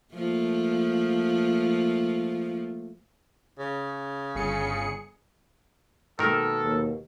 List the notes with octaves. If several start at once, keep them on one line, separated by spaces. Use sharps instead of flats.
F3 A3 A#3
C#3
G1 G#4 C#7
B2 D#3 G#3 A#3 A4 A#4
D#2